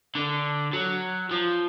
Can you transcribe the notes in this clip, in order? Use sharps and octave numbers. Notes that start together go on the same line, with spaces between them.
D3
F#3
F3